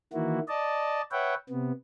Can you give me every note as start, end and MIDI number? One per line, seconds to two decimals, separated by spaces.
0.13 0.39 51
0.13 0.39 52
0.13 0.39 58
0.13 0.39 64
0.13 0.39 66
0.48 1.02 74
0.48 1.02 75
0.48 1.02 81
1.12 1.34 71
1.12 1.34 73
1.12 1.34 76
1.12 1.34 78
1.12 1.34 79
1.50 1.72 48
1.50 1.72 59